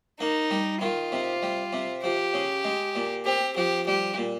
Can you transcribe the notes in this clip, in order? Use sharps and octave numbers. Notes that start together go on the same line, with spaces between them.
A#3 D#4
G3
D#3 F4
C3
G3
C3
F3 G4
C#3
G#3
A#2
C4 G4
F3 G4
G3 G4
A#2